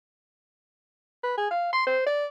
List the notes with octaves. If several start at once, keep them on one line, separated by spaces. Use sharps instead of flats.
B4
G#4
F5
C6
C5
D5